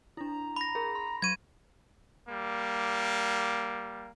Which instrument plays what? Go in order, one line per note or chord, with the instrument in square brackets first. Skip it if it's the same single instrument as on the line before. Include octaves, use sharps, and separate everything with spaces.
[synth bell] D4 E4 [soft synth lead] A#5
[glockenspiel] B5 A#6
[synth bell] G#4 A#4
C6
[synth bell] F#3 C#6 [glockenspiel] G#6 D#7
[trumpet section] G3 A#3